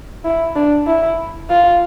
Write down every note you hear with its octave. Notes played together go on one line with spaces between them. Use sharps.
E4
D4
E4
F4